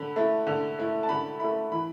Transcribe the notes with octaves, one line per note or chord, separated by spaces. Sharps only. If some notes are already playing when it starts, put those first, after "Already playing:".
Already playing: D3 B5
A3 E4
D3
A3 E4
A5
D3 B5
A3 E4 B5
E3 B5